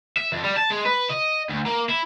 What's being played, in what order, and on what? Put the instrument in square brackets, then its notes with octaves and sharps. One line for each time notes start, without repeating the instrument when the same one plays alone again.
[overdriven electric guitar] E5
F2
G3
A5
G#3
B4
D#5
D2
A#3
E4